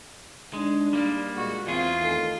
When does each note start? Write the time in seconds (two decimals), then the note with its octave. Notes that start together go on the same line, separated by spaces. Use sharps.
0.54 G#3 D4 D#4
0.93 G3 A#3
1.36 A#2 G#3 F#4
1.67 E2 C4 F4 G#4
2.00 D#3 A3 A4